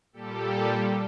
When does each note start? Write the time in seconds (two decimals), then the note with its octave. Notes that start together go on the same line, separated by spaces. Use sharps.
0.13 A#2 G3 G4 A4